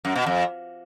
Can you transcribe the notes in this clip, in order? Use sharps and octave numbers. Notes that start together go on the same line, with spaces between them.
F#2
B2
F2